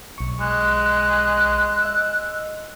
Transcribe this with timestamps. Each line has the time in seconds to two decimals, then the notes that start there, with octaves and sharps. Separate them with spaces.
0.18 B1 C#6
0.40 G#3 F#6
1.82 D#5 E6